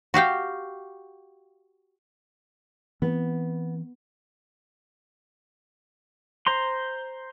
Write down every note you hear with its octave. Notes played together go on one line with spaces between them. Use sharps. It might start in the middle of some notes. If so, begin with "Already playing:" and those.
F#4 G4 F5 G5
E3 B3 C4
C5 A#5 C6